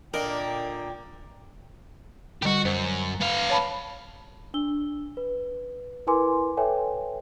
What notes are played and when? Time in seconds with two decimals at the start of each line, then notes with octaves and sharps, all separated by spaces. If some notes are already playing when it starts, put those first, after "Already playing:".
0.14 A#2 D3 A#3 D4 A#4 D#5 G5
2.43 D3 G3 F#4 G4
2.65 F#2 C5
3.21 B3 F5
3.50 C#5 A5 B5
4.54 D4 E6 G7
5.17 B4
6.07 E4 A#4 B4 G#5 C6 D6
6.57 A4 B4 C#5 E5 G5 G#5